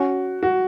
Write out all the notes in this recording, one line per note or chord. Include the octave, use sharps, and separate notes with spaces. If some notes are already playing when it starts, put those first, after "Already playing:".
Already playing: C#4 F#4
F#4